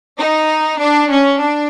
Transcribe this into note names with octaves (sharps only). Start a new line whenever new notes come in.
D#4
D4
C#4
D4